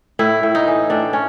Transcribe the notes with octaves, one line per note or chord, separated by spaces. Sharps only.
A2 E4
A2
D#4
E3
A2 D4
C#4